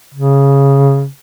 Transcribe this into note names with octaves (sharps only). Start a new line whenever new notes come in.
C#3